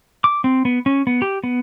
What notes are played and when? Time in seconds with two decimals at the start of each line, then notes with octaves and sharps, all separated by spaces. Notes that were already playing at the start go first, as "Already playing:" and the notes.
0.24 D6
0.44 C4
0.65 B3
0.86 C#4
1.07 B3
1.22 G4
1.44 B3